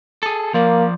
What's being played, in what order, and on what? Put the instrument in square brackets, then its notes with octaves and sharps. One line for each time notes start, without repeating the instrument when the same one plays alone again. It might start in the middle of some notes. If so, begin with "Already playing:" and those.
[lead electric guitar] G#4 A4
[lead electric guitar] F3 D5 [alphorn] A#3